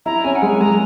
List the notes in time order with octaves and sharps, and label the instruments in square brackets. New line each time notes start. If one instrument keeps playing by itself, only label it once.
[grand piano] E4 [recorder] A#5
[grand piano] C#4 [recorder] G#5
[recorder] F#5
[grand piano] G#3 [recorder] G#5
[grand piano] G#3 [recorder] A#5